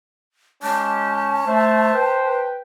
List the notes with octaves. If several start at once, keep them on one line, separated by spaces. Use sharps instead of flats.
G#3 C#4 G4 A5
A3 C5
B4 G5